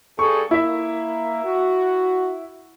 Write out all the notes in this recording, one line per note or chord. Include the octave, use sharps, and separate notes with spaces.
G2 G#4 A4 C#6
A#3 E4 E5
F#4